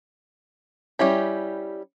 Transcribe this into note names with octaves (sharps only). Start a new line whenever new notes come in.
G3 C#4 E4 G4